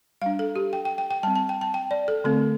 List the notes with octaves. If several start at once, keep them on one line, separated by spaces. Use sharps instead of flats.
G3 D4 F5
A4
G4
G5
G5
G5
G5
G3 C4 A5
A5
G5
A5
G5
D5
A4
D3 A3 C4 A4